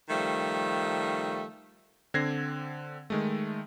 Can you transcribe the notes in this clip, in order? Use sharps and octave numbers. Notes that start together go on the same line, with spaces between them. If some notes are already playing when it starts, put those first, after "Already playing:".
D#3 F3 G3 A3
D3 C4 G#6 A#6 C7
D#3 G#3 A3